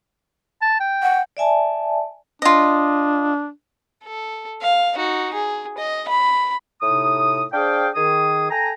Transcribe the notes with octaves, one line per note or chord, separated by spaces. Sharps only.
A5
G5
F#5
D5 E5 G#5 A5
D4 F4 D#5
A4
F5
D#4 F#4
G#4
D#5
B5
A2 C3 D#4 D#6
D4 G#4 C5 F5 G5
D#3 G#4 D#6
A4 G5 G#5 A#5